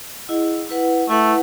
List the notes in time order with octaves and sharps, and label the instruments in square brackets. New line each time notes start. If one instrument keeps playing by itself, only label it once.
[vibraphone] E4 G#4 D#5 F#5
E4 B4 F#5
[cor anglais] A3 [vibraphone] E4 B4 F#5